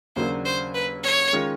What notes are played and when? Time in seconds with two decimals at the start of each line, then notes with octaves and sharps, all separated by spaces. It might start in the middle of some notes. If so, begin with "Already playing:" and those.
0.16 D#2 C#3 F#3 A#3 D4 C5
0.45 C5
0.74 B4
1.04 C#5
1.33 D#3 G#3 C#4 F4